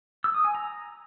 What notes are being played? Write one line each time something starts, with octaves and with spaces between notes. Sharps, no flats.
E6
D#6
G#5
A#5